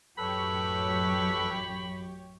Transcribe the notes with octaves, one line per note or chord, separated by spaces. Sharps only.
A1 F#2 G4 A4 B4 C#5 B5